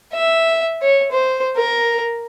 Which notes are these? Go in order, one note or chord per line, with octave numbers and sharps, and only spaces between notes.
E5
C#5
C5
A#4